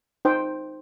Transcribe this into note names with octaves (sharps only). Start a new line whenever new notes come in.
D#4 C5 G5